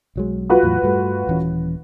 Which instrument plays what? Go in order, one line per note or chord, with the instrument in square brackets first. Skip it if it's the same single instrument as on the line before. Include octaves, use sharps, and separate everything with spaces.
[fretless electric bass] B1 F#3 G#3
[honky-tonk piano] F4 F#4 B4
[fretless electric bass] E2 A2 F#3
G2 G3 A3
D#1 E3 C#4